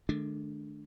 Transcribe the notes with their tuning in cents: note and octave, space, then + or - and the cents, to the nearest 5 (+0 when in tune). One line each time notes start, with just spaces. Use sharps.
D#3 -45 A3 -45 D4 +0